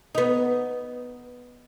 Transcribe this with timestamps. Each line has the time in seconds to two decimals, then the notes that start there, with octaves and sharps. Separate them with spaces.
0.15 B3 D#4